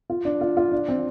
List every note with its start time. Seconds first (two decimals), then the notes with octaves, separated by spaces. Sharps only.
0.10 F4
0.25 D4
0.41 F4
0.57 F4
0.71 D4
0.88 C4